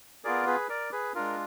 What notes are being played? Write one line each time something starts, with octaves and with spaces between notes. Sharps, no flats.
B3 F4 G#4 A#4 D5
G#4 B4
A#4 D5
G#4 B4
G#3 D4 F4 A#4